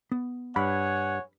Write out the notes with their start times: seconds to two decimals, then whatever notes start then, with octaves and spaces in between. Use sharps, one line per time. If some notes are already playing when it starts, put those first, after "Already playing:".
0.12 B3
0.56 G2 C#5 F#5 G#5 B5